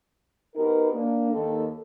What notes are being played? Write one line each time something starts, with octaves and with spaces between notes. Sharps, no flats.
B2 B3 D#4 G4 A#4
A#3 D4
D#2 A4